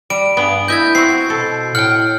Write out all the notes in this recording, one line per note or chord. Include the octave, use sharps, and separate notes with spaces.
G3 D7
G2 B3 G#4
E4 D#5 E5 G6 G#6
C4 F#4 C7
B2 A4
A2 F#5 G5 F6